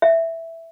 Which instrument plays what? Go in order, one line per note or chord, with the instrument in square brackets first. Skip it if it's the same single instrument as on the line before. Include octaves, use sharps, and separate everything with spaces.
[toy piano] E5